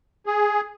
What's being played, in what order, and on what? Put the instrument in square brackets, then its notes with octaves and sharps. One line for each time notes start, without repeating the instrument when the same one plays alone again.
[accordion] G#4